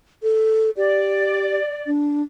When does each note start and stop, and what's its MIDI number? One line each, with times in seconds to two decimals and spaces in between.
0.23 0.70 69
0.77 1.59 67
0.77 1.90 74
1.87 2.22 62